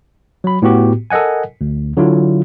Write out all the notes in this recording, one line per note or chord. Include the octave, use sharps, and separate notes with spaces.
F#3 B5
A2 B3 F#4 G4
A4 A#4 D#5 F#5 G#5
D2
D3 F#3 E4 F4